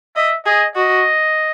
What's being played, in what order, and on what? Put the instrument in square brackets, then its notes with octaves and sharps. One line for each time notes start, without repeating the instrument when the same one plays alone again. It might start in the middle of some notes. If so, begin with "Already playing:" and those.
[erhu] D#5 [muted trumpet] E5
[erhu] G#4 [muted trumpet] D#5
[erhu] F#4 [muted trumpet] D#5